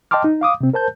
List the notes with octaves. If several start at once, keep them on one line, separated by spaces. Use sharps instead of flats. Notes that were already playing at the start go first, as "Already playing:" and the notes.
D#5 G5 A5 C6 D6 F6
D#4
F5 D6 D#6
C3 C4
A#4 C5 A5 G6